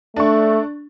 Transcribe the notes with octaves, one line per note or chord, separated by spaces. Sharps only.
A3 D4 C#6